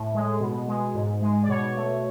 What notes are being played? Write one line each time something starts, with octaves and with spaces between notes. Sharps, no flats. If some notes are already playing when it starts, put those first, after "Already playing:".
Already playing: A2
G#3
B2
G#3
G#2
G#3
D5
B2 C#5
A3